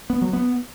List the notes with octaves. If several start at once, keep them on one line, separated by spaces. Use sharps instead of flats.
B3
F#3
B3